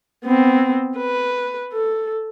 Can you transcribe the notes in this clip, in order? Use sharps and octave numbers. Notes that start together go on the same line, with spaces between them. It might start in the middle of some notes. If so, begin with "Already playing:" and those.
B3 C4
B4
A4